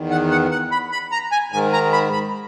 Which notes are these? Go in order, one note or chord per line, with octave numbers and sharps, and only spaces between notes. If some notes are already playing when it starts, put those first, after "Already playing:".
Already playing: E2 D#3
F#5
F#5
F#5
B5
B5
A#5
G#5
G#2 D#3 G#5
A#5
B5
B5